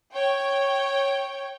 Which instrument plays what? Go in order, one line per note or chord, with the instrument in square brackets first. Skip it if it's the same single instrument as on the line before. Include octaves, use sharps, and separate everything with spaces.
[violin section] C#5 G5